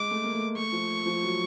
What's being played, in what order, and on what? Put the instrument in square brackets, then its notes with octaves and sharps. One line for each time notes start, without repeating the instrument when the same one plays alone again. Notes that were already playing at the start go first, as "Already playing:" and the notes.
Already playing: [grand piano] G#3 [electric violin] D6
[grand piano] A3
A#3
A3
[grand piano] A3 [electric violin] C#6
[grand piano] F3
F3
F#3